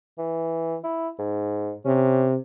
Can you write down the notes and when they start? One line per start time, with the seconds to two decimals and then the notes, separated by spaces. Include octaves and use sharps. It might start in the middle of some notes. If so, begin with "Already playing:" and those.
0.18 E3
0.84 E4
1.19 G#2
1.85 C3 C#4